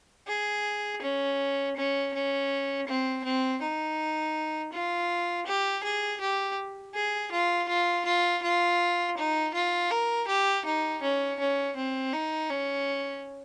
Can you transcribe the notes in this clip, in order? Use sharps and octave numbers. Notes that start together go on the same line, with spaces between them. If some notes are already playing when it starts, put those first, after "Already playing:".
G#4
C#4
C#4
C#4
C4
C4
D#4
F4
G4
G#4
G4
G#4
F4
F4
F4
F4
D#4
F4
A#4
G4
D#4
C#4
C#4
C4
D#4
C#4